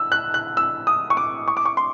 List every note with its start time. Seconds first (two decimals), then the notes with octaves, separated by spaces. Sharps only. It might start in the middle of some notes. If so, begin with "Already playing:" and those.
Already playing: E6
0.12 F#6
0.34 F#6
0.57 E6
0.87 D#6
1.10 C#6
1.17 D6
1.48 C#6
1.57 D6
1.65 C#6
1.77 C6